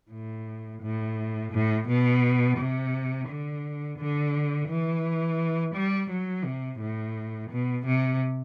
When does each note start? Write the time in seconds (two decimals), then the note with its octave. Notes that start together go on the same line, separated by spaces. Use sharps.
0.11 A2
0.82 A2
1.52 A2
1.88 B2
2.58 C3
3.28 D3
3.99 D3
4.68 E3
5.75 G3
6.10 F#3
6.45 C3
6.80 A2
7.50 B2
7.85 C3